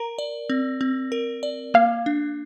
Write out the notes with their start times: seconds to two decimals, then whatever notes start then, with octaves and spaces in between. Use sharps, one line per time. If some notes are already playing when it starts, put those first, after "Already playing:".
Already playing: A#4 A#5
0.18 D5
0.50 C4
0.81 C4
1.12 A#4
1.43 D5
1.74 A#3 F5
2.06 D4